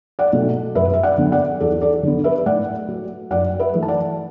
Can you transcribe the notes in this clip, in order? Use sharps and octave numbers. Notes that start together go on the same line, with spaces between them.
D5 F#5
B2 A3
F#2 B4 E5
E5
D5 F#5
D3 B3
D5 F#5
E2 A4 D5
A4 D5
D3 B3
B4 E5
A2 D5 F#5
F#3 A3
F#2 D5 F#5
B4 E5
E3 A3
A5
D5 F#5